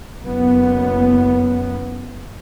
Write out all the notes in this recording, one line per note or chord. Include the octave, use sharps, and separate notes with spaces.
F#1 F#2 B3